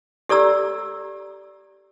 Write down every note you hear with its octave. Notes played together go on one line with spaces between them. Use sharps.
G4 A4 D5 A#5 E6